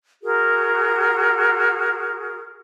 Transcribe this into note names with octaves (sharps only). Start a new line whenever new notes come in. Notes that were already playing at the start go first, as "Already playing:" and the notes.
F#4 G#4 A#4